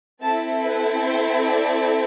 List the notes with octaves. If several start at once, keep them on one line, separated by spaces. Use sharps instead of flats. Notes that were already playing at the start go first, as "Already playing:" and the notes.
C4 E4 A4 A5
B4
C5
D5